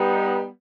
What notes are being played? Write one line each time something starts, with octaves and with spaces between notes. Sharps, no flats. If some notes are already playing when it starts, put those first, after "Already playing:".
Already playing: G3 B3 D#4